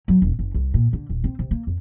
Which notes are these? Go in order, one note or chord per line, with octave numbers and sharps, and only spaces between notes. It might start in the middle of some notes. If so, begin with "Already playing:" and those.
F#3
E1
F#1
C2
A#2
D3
D#1
C4
C3
A#3
F2